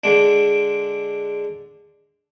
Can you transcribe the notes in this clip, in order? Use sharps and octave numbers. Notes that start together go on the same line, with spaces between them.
D3 G#3 D4